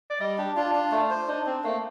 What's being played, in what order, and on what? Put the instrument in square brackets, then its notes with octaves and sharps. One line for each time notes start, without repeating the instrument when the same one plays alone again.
[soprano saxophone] D5
[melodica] G3 [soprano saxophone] D#5
[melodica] D4 [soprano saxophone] G4
[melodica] D4 [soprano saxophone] F4
[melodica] D4
A3
C5
[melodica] D4 [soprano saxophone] D#4
[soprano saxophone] C4 [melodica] D4
[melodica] A3 [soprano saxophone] A#3